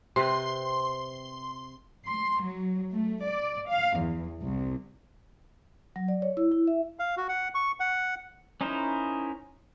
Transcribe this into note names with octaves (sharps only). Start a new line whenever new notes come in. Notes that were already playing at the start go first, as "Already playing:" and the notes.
C3 C4 B4 C6
C6
F#3
A3
D5
F5
E2
C2
F#3
D5
C#5
E4
E4
E5
F5
F#4
F#5
C#6
F#5
C#4 D#4 E4 A#4 C5